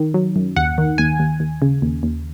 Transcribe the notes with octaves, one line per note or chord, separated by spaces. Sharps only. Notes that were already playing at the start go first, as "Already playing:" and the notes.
Already playing: D#3
F#3
F#2
D#2 F#5
D#3
D#2 G#5
D#2
D#2
C#3
D#2
D#2